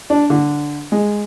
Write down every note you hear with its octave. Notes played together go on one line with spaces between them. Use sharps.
D4
D3
G#3